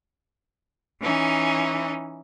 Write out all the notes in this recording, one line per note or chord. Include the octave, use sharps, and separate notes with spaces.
E3 C#4 D#4